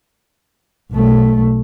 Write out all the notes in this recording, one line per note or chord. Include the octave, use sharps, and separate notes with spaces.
B1 A3